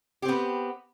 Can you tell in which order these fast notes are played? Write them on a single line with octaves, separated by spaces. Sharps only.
G4 C4 B3